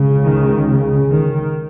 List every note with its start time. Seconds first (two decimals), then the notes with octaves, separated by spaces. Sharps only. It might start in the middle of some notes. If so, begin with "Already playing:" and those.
Already playing: C#2 C#3
0.23 D#3
0.68 C#3
1.11 D#3